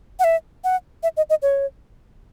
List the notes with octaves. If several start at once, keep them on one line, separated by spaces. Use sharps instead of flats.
F#5
E5
F#5
E5
D#5
D#5
C#5